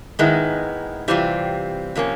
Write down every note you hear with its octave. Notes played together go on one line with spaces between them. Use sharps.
G#2 D#3 G#3 B3 E4
C3 E3 G3 C4 F4
C3 F3 A#3 C#4